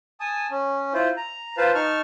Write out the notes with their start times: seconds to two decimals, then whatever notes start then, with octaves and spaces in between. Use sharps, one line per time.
0.20 G#5 A5 D#6
0.51 C#4
0.94 E4 F4 C5
1.17 A#5
1.57 F4 B4 C5 F5 A5
1.75 D#4 A5 C#6 F6